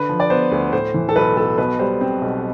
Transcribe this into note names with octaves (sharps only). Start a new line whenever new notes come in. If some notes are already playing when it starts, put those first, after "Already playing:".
Already playing: D3 B4
F3
D5
B3 C5
D2
A2 C5
E3
A4
B1 B4
B1 A4
B2 B4
G3 C5
C4
B1